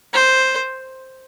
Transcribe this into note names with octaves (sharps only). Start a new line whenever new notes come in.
C5